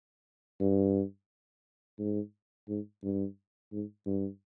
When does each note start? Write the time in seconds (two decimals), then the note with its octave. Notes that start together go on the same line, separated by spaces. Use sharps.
0.60 G2
1.99 G#2
2.69 G#2
3.03 G2
3.72 G#2
4.06 G2